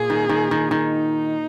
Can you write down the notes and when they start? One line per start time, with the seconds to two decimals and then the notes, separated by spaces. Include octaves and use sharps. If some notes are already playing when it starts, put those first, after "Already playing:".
Already playing: A#2 G#4
0.10 D#3
0.29 D#3
0.51 D#3
0.71 D#3 D#4